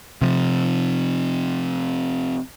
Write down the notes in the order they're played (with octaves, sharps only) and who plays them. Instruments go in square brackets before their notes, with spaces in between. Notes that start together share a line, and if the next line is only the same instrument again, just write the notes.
[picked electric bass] C3 F3